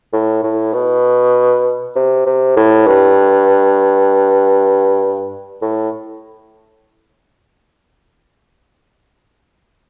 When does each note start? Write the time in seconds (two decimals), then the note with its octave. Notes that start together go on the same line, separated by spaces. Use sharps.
0.13 A2
0.43 A2
0.74 B2
1.96 C3
2.26 C3
2.56 A2
2.87 G2
5.61 A2